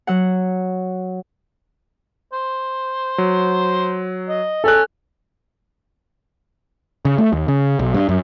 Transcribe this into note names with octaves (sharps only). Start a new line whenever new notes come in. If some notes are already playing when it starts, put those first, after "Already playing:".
F#3 F#5
C5
F#3
D#5
C#4 A4 F#6
C#3
A3
D#2
C#3
B1
G2
F#2